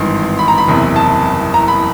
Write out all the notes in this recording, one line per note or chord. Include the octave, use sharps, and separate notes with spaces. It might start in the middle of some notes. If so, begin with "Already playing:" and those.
Already playing: G#1 G2 E3 C6
B5
A#5
B5
F#1 E2 C3
A5
A#5
B5